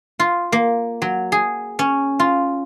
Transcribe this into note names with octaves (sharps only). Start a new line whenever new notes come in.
F4
A#3
F#3
G#4
C#4
F4